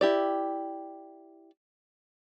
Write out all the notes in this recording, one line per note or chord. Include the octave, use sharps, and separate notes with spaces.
E4 G4 D5